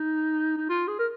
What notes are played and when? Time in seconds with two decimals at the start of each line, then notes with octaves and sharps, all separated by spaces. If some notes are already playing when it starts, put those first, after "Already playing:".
Already playing: D#4
0.58 D#4
0.69 F4
0.88 G#4
0.99 A#4